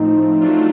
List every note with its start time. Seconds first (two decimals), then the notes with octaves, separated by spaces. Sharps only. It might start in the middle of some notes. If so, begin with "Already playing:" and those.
Already playing: A2 F3 A3 C4 D#4
0.40 F#3 A3 D4 F4